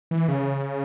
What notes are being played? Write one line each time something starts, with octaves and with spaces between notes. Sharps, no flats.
E3
C#3